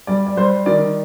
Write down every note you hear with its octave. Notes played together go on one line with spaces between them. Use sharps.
G3 D5
D5
G3 C5
D#3 D5